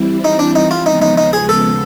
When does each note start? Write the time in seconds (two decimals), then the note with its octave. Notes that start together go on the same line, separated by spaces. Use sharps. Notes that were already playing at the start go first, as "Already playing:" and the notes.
Already playing: E3 G3 C4 E4
0.25 D#4
0.39 D4
0.55 D#4
0.71 F4
0.86 D#2 C#3 F3 G#3 B3 D#4
1.02 D#4
1.18 D#4
1.33 G#4
1.49 A4